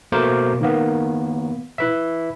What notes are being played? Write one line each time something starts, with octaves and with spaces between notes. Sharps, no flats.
B2 A3 A#3 A#4 C5 D6
D#3 A#3 B3
E4 B4 E5